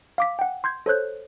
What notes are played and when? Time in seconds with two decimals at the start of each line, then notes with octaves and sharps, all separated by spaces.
0.18 F5 D6 B6
0.39 F#5 G5
0.64 C6 G6 G#6
0.86 A4 C5 C#5 F#6 G6